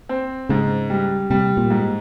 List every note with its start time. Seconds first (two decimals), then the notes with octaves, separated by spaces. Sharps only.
0.09 C4
0.49 G#2 C#3
0.90 G3
1.30 C3 G3
1.57 A#2
1.70 G#2